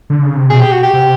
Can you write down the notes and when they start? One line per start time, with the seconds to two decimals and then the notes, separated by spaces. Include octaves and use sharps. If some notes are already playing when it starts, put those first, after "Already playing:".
0.10 D3
0.23 C#3
0.36 C3
0.50 B2 G#4
0.61 G4
0.72 F#4
0.83 G4
0.93 C3